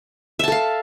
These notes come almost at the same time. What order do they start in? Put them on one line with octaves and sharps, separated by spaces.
E5 A5 A4 F5